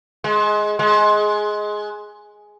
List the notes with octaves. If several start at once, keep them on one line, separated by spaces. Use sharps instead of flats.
G#3
G#3